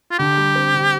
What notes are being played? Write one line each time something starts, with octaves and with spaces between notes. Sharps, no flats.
F4
D3 G4
G3
C4
D3